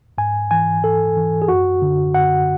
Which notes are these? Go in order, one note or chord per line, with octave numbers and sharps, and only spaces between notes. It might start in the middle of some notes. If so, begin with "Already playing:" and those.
G#2 G#5
E3 G#5
G#2 A4
E3
G#4
F#2 F#4
D3
F#2 F#5